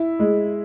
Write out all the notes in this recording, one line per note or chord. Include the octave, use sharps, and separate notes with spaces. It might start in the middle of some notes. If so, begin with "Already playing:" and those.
Already playing: E4
G#3